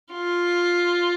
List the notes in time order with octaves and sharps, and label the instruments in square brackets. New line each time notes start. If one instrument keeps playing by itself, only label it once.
[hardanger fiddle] F4